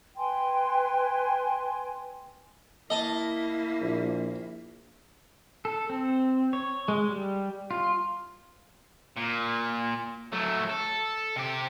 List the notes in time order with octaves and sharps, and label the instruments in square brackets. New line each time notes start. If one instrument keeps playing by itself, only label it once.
[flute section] B4 G5 G#5 C6
[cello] A#3 E4 [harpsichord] D#5 A5
[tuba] A#1
[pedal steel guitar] A4
C4
C#5
G#3
G3
F4
[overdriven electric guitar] A#2
F#3 A3
A4
C3 G4